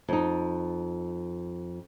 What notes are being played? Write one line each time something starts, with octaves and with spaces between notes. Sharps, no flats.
F2 D#4